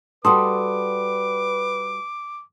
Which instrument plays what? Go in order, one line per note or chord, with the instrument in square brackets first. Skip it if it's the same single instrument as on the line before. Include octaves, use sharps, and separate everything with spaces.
[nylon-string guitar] G3 F#4 A4 [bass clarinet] B4 [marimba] C6 D#6 [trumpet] D6